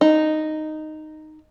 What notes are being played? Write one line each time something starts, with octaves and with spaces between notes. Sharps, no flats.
D#4